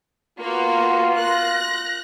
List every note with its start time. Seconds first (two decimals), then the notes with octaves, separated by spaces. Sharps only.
0.39 A#3 B3 F4 F#4
1.16 F#6 A#6